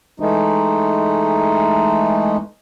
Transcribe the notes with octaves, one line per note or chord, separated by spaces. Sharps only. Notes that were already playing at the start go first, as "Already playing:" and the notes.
E3 G#3 A3 D#4